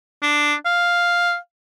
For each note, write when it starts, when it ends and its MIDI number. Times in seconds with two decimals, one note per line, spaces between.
0.22 0.54 62
0.66 1.36 77